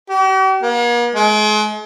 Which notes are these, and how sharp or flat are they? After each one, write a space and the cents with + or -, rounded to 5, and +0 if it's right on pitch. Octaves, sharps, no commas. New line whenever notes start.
G4 -45
A#3 +45
G#3 +40